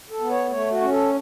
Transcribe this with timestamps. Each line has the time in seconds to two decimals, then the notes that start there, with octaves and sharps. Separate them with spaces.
0.10 A4
0.21 B3
0.30 C#5
0.51 A3 C#5
0.71 F#4
0.81 C#4
0.91 A4